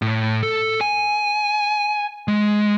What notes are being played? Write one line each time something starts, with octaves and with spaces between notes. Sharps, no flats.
A2
A4
G#5
G#3